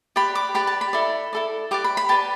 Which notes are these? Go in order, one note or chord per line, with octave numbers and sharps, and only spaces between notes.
G4 B4 D5 B5
D6
G4 B4 D5 B5
A5
B5
E4 A4 D5
E4 A4 D5
G4 B4 D5 D6
B5
B5
G4 B4 D5 A5